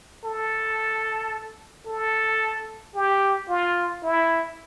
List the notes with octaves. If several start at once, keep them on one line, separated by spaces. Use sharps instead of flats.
A4
A4
G4
F4
E4